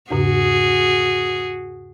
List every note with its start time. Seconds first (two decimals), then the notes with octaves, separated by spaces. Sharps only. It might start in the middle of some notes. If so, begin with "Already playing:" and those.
0.10 E2 G#2 C#3 F#4 G#4